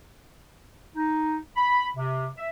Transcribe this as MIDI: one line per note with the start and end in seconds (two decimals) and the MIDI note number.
0.96 1.36 63
1.56 1.86 83
1.95 2.27 48
2.38 2.49 76